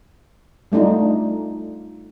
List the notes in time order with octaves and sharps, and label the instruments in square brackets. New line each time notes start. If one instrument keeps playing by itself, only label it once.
[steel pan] G3 A3 D4 D#4 F4